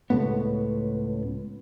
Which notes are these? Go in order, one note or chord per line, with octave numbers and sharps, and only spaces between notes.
C#2 A2 B3